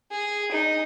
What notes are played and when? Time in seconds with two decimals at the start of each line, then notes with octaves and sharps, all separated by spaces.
0.11 G#4
0.52 D#4